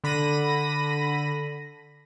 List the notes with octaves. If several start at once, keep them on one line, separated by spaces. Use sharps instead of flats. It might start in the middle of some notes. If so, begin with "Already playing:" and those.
D3 B5 A#6 D#7